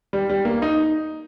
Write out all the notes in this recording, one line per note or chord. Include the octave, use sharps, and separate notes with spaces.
G3
G3
A#3
D#4